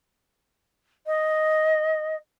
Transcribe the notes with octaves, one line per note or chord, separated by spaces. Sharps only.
D#5